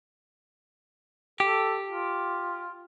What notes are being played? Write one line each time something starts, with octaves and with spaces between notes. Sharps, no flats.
G4 A4
F4